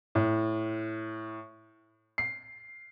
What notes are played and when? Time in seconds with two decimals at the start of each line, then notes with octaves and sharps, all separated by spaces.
0.15 A2
2.18 C7